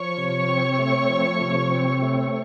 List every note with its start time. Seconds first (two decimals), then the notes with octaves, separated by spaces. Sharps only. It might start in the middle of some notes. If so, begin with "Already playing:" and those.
Already playing: F3 C#5 C#6
0.18 C3
0.48 C4
0.79 A3
1.09 F3
1.41 C3
1.71 C4
2.02 A3